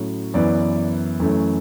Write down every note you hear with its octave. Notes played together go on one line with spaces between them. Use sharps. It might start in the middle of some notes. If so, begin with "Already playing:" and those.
Already playing: A2 F#3 C#4
F#2 E3 B3 D5
F#2 E3 A3 C#4